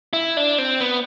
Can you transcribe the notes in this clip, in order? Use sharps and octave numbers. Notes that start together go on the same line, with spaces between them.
E4
D4
C4
B3